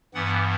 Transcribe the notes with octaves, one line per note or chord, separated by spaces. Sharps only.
G2 E3 B3 F#5